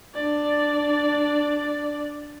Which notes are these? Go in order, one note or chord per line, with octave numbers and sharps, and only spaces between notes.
D4 D5